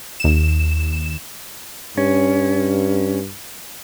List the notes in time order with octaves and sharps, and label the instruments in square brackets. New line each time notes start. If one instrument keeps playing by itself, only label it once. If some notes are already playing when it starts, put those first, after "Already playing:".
[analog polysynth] D#2 E7
[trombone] G2 [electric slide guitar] C#4